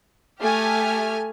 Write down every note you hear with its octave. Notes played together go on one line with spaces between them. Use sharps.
A3 G4 G#5 F6